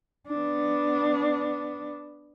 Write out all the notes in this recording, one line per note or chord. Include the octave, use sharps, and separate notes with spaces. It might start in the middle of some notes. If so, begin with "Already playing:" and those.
B3 D4